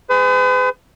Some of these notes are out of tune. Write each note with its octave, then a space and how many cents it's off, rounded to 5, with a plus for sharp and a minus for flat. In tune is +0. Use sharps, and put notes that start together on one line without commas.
G#4 -10 B4 +45